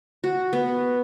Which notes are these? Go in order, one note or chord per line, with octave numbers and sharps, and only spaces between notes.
F#4
B3